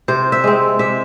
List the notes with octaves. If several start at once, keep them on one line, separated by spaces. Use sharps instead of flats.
C3 C5
E5
G#3 C4
C3 E5